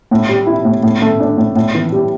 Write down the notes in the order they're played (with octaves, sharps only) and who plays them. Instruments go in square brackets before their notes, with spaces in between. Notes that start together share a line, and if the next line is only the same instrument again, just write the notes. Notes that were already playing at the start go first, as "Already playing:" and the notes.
[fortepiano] A2
G3
E4
A2
A2
A3
D4
A2
A2
E3
G3